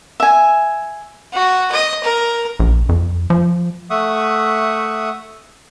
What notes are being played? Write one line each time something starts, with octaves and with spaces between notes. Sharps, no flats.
E5 G#5
F#4
D#5
A#4
A#1
F2
F3
A3 E5 F#5 C#6 D#6